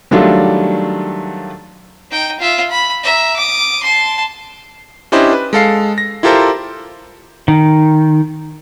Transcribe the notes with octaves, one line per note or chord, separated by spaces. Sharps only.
D#3 F#3 G3 A3 D4 F4
D#4 G5
F4 E5
B5
E5 A#5
D6 D#6
A5 C6
C#4 D4 E4 G4 C5 D#5
B4
G#3 A4 F5 C7
A#6
E4 F4 G4 A4 A#4 C5
D#3